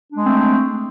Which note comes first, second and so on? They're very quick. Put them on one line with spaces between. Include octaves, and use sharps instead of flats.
D4 G#3 A3 C4